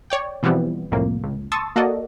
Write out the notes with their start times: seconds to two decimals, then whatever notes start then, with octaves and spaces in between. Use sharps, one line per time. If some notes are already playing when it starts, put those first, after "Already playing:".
0.10 C#5 D5 G5
0.43 B2 E3 F3 G3 B3 C4
0.91 C2 F2 A2 A#3
1.24 C#2
1.52 A5 C6 C#6 D#6 E6 A6
1.76 A#3 F#4 A4 D5 D#5